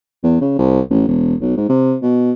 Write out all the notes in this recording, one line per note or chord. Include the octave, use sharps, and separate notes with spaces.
E2
C#3
C2
A1
E1
B1
G#2
C3
B2